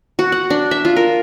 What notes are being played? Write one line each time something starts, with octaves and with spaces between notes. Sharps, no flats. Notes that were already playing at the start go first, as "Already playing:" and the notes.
F#4
F#5
D4
E5
F4
A#4